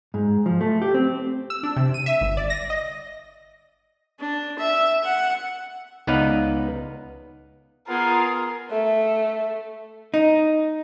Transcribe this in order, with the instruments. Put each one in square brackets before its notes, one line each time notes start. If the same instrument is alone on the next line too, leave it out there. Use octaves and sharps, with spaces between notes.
[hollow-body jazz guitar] G#2
F3
A3
G4
C4
[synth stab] E6
D4
C3
D#7
E5
G1
D5
A#6
D#5
[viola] D4
E5
F#5
[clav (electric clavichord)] C#2 B3 D#4 B4 D5 F5
[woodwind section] B3 F4 G#4 [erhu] A#4
[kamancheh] A3
[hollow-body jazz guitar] D#4